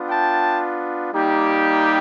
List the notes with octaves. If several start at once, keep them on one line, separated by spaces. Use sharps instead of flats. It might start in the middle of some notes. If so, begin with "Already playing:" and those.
Already playing: B3 D4 F4
G5 A5
G3 A#3 D#4 G4